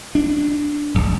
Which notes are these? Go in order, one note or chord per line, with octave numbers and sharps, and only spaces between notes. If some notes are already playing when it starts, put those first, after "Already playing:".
D4
D1 G1